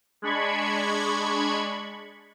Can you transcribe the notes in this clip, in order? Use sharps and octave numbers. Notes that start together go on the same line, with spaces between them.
G#3 D4 B5 C#6 G#6